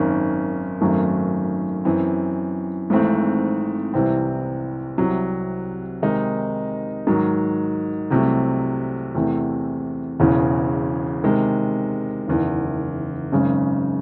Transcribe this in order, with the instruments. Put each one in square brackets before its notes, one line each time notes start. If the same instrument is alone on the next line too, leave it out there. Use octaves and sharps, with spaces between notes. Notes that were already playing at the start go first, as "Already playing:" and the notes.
Already playing: [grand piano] G#1 F#2 D#3
G#1 F#2 D#3 F#3 A3
F#2 E3 C4
G#1 G#2 E3 A3 C4
C2 C3 E3 C4
C2 C3 F#3
C3 D#3 G#3 D#4
G#2 D#3 F#3
C2 C3 F#3 A3
E2 C3 E3 A3 C4
E1 E2 C#3 E3
C3 D#3 G#3
F#1 E2 D#3
G#1 F#2 C#3 G#3